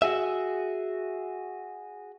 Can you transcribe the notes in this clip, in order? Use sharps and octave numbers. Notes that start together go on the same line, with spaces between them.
F#4 G#4 E5